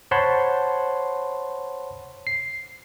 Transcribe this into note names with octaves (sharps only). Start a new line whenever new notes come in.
C5 C#5 F#5 A5 B5 C6
C7